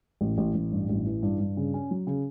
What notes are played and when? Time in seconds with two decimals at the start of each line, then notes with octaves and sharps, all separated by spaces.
0.21 A1
0.38 A1
0.55 A1
0.72 G2
0.89 A1
1.06 E3
1.22 G2
1.40 G2
1.57 C#3
1.74 C#4
1.91 F#3
2.07 C#3